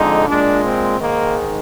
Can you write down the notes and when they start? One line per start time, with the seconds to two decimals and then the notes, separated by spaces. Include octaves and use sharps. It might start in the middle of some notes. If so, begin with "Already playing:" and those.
Already playing: F2 D3 G#3 D#4
0.28 A#2 G#3 D4
0.64 C4
1.00 G#2 D#3 G#3 A#3